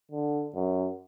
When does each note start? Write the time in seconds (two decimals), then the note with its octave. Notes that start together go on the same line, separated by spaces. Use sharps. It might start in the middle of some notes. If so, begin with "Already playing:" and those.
0.11 D3
0.55 F#2